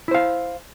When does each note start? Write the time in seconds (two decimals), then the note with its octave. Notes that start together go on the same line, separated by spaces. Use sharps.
0.08 E4
0.11 C5
0.15 F5